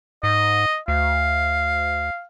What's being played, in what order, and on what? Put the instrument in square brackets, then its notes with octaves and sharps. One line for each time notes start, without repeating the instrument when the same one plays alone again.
[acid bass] G#2 [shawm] D#5
[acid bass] D2 [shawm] F5